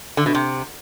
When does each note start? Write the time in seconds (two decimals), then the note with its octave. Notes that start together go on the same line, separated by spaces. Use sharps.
0.17 D3
0.26 B2
0.35 C3